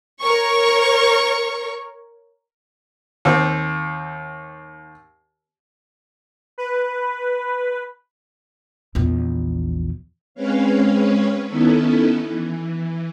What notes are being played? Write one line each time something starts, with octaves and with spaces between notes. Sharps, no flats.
A#4 C#5 C#6
D#2 C4
B4
A#1 E2
G#3 C4 C#4 B4 C#5 F5
D#3 B3 C#4 D#4 E4 A4
E3